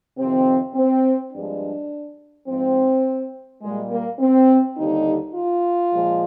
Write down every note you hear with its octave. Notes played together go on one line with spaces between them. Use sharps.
F2 C3 D#3 C4
C4
G2 F3 G#3 D4
G#2 F3 G#3 C4
A#2 G3 G#3
A#3
C4
D#2 D3 G3 D#4
F4
A#2 F3 G#3